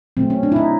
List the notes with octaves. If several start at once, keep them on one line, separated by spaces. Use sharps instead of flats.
B2 F#3 A3 C4
C#4
D4
E4
D#4